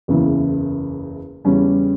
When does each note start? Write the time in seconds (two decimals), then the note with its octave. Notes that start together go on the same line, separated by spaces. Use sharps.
0.08 F#1 E2 C#3 E3
1.45 E2 C#3 G3 C#4